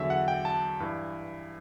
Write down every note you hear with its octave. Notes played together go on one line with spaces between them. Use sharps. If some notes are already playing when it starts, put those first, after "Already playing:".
Already playing: E2 D3 F#3 E5
F#5
G5
A5
G2 E3